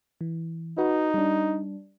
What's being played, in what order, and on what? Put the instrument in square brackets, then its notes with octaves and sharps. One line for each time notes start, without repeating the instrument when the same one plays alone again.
[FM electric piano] E3
[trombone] D#4 [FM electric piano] F#4 B4
[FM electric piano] G3 D4